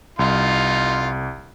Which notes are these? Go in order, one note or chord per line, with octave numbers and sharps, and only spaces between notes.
C2 D#4 F4